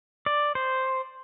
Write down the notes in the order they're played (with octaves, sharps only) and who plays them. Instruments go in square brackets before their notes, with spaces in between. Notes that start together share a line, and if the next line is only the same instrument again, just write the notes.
[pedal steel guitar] D5
C5